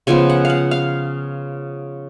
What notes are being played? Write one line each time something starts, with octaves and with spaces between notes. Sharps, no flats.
C#3 F3 B3 G#5
F#5
F5
F#5
F5